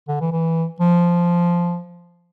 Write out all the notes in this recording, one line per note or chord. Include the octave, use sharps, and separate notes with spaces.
D3
E3
E3
F3